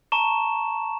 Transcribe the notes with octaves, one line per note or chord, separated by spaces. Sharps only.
A5 A#5 C#6 E7